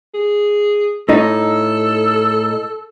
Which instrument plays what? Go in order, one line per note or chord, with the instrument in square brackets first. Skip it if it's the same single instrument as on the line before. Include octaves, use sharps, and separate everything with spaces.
[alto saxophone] G#4
[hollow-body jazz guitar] A2 D#4 [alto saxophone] A4